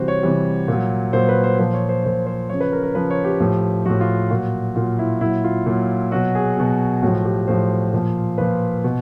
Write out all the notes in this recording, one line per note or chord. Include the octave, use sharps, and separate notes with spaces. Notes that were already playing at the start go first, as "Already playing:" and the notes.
Already playing: C3 E3 G3 F#4 C5
C#5
C3 E3 G3
A#2 F#3
A#2 F#3 C5
B4
C5
A#2 F3 C5
C#5
C5
A#2 F3 C5
C5
C#3 F3 C#5
B4
A#4
A#4
C#3 F3 B4
C#5
G4
A2 F3
A2 F3 F#4
F4
A#2 F#3 F#4
A#2 F#3 F4
E4
A#2 F#3 E4
F4
A#2 F#3
B2 F#3 F#4
G#4
B2 F#3
A2 F3 F#4
G4
A2 F3 C5
A#2 F3
A#2 F3 B4
B2